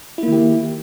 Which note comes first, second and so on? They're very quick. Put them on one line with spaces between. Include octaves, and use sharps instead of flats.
E4 A#3 D#3 G4